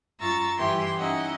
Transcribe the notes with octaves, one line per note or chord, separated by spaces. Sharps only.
F#2 F4 A#5 C#6 E6 A6
G2 E3 E4 G4 G5 C6
C#4 D#4 E4 D#5 F#5